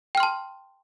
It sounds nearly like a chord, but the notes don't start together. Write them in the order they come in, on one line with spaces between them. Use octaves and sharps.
G5 F6 C6 A5